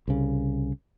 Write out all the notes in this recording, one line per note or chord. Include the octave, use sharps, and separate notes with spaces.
C2 C#3